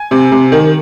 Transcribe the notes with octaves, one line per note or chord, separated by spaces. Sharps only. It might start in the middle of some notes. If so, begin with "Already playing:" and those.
Already playing: G#5
C3
C3
D#3